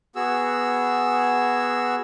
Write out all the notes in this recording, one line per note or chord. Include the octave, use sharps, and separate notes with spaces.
B3 F#4 G#4 E6